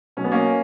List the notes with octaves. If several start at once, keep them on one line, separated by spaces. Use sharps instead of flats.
B2 F#3 C#4
B3
A#3 C#4